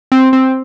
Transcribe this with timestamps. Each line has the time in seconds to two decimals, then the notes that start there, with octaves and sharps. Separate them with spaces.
0.12 C4
0.33 C4